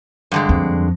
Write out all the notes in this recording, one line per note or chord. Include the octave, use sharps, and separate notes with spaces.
G2 D3 G#3
F2